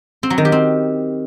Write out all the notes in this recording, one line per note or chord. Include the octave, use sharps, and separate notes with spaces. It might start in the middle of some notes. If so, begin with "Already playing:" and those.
C4
F#3
D#3
G4
C4